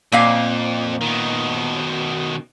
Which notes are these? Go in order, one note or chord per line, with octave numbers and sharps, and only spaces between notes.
F2 A#2 A#3 F5
B2 D#3